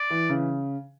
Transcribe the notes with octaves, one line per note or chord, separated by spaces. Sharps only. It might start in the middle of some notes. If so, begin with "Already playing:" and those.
Already playing: D5
E3
C#3